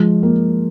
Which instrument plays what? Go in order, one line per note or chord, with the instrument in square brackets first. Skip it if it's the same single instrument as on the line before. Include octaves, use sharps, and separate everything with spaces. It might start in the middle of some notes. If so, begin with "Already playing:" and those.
Already playing: [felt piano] F3 [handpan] G#3
[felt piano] A#3